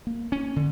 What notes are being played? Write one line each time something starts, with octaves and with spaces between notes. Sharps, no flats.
A#3
C#4
D3